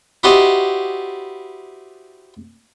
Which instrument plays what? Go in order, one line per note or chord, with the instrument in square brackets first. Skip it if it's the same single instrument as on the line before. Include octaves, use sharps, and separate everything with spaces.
[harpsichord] E4 F#4 G4 C5 D5 D#5